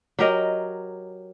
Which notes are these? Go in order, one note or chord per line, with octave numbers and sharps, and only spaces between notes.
F#3 G4 A#4 D#5